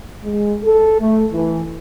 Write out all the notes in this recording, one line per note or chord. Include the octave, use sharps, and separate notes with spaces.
G#3
A4
A3
E3